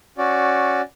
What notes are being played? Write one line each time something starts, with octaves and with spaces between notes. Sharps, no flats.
C#4 F#4 D5